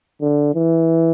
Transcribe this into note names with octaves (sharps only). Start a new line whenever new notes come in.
D3
E3